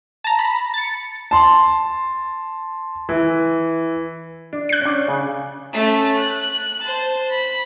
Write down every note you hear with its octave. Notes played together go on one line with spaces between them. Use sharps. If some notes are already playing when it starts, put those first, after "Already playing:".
A5 A#5
B5
A6 C#7
A5 C6
E3
D4
F#6 C7
C#4 D4
C#3
A3 C#4
F#6
C5 A5
B5